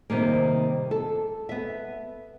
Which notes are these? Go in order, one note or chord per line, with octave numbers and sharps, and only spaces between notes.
C3 D#3 G3 A#3
A4
B3 E5